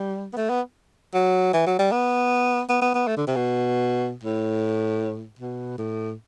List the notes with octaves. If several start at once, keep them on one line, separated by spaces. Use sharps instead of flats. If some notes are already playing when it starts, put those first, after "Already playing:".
Already playing: G3
B3
A3
B3
F#3
E3
F#3
G3
B3
B3
B3
B3
A3
D3
C3
B2
A2
B2
A2